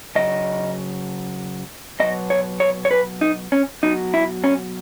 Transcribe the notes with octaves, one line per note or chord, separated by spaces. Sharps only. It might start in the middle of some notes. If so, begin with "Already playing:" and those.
C#3 F#3 D#5
B2 F#3 D#5
C#5
C#5
C#5
B4
D#4
C#4
B2 F#3 D#4
E4
C#4